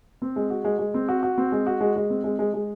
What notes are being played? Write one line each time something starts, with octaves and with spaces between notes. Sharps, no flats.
C4
G#3
F#4
G#3
G#3
C4
F#4
F#4
C4
G#3
F#4
G#3
G#3
C4
G#3
G#3
G#3